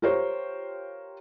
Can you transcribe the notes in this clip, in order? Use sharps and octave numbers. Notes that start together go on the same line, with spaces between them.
F4 G4 A#4 C5 C#5